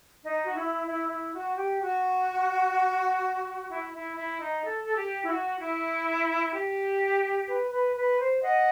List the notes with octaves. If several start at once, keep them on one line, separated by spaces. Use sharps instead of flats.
D#4
F#4
E4
E4
E4
F#4
G4
F#4
E4
E4
E4
D#4
A4
A4
G4
E4
F#4
E4
G4
B4
B4
B4
C5
D#5 F#5